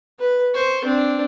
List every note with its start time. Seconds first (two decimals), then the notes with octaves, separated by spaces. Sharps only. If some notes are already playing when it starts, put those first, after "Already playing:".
0.19 B4
0.54 C5 C#6
0.85 C4 D4